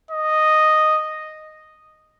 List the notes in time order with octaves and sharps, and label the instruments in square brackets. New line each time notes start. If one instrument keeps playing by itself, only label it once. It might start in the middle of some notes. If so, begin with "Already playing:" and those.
[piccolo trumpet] D#5